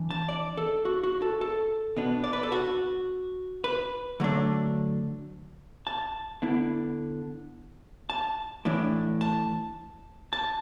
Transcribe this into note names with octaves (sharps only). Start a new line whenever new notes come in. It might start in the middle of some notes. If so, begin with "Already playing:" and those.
Already playing: E3 D4
A5
D5
A4
F#4
F#4
A4
A4
B2 B3 D4
D5
B4
A4
F#4
B4
D3 F#3 A3 D4
A5
D3 B3 E4
A5
A2 E3 D4
A5
A5